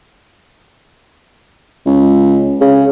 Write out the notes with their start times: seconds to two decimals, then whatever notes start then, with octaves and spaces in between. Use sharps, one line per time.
1.86 C#2
2.61 C#3